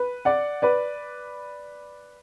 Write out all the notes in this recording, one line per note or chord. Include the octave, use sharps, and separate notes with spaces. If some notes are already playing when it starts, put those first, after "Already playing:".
Already playing: B4
D5 F#5
B4 D5